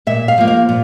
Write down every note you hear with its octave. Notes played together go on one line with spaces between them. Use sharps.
A#2 E5
F5
F3 A#3
F5
A#2